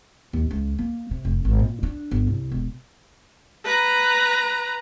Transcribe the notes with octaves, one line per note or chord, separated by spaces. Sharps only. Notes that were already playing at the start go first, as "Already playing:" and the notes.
D#2
C#2
A#3
C3
F1
G#1
A#2
D4
G1
C2
E1
B4 A#5